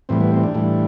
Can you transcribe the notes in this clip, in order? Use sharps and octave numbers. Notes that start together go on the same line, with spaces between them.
A2 E3 G3 C4
B3
C4
D4
A2 E3 G3